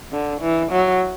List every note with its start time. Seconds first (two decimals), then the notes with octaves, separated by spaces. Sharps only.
0.12 D3
0.42 E3
0.72 F#3